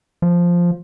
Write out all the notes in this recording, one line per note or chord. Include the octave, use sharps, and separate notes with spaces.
F3